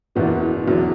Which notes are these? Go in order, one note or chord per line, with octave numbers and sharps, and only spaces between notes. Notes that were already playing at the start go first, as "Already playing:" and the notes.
F#1 E2 B2 B3 D4
E1 E2 B2 F#3 D4